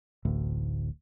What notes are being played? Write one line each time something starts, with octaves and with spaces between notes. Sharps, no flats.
D1 A1 D2 A2